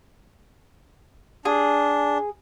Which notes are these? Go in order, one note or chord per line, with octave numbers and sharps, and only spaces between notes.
D4 G#4